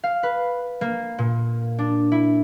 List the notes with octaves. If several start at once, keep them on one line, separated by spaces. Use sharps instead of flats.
F5
B4
A#3
A#2
D4
E4